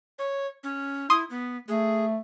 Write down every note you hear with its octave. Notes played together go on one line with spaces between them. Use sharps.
C#5
C#4
E4 C6 D#6
B3
A3 G#4